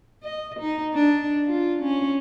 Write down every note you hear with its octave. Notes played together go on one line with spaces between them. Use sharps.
D#5
D#4
D4
F4
C#4